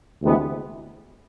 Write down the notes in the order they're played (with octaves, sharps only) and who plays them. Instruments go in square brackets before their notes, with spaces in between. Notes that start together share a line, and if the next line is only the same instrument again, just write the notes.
[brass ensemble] D2 C3 E3 G#3 B3